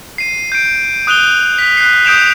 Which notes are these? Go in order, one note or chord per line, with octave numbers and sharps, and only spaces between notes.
C7 D#7
G6 D7
D#6 F#6 D#7 F7 G7
B6
F#6 C7
D#6 G6 D7 E7 F7